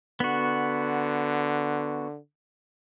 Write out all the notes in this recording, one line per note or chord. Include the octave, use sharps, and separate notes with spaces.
D3 B3 F#4